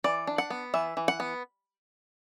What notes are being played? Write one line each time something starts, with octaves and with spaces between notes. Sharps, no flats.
E3 D5
D4
F#5
B3
E3 E5
E3
F#5
B3